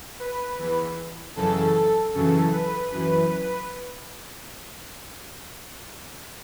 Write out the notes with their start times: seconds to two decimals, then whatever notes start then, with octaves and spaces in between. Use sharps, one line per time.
0.20 B4
0.59 E2 E3
1.36 F#2 C#3 E3 A4
2.13 F#2 C#3 E3 A4
2.52 B4
2.92 F#2 E3 B4
3.30 B4